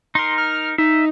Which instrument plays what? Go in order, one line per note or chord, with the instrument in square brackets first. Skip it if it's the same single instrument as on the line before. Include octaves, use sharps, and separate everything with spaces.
[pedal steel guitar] D#4 A#4 [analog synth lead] C6
[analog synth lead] F6
[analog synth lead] D#4 [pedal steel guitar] E5